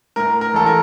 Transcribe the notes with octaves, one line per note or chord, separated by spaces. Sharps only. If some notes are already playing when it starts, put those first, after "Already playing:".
A2 A#4
A#4
A1 A4
A#4